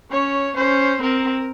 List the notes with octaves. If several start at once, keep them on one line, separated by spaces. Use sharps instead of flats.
C#4 C#5
C#4 C5
C4 A#4